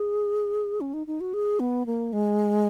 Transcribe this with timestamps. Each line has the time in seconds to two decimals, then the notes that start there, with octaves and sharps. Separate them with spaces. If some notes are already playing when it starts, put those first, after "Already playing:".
Already playing: G#4
0.81 C#4
0.94 D#4
1.07 D#4
1.21 F#4
1.34 G#4
1.60 B3
1.86 A#3
2.13 G#3